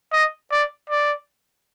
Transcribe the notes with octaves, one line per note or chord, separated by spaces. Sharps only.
D#5
D5
D5